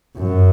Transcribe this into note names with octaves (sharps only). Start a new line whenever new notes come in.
F#2